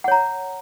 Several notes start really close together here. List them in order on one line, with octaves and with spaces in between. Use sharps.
F#5 C#5 A#5